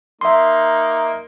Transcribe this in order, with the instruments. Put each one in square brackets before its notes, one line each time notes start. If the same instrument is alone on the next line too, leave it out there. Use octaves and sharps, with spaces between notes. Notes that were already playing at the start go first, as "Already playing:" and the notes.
[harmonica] A#3 D#4 [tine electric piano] E5 C6